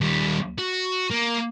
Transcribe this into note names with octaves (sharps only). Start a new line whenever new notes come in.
D#2 G3
F#4
A#3